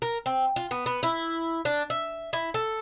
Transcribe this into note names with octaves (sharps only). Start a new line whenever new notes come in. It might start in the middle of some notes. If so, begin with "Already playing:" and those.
A#4
C4
F4
B3
B3
E4
D4
E5
E4
A4